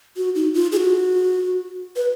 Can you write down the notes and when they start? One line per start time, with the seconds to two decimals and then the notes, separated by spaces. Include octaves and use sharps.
0.17 F#4
0.35 D#4
0.54 F4
0.72 G#4
0.77 F#4
1.96 B4